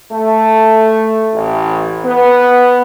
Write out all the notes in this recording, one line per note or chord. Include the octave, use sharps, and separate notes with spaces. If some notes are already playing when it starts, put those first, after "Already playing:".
A3
A1
B3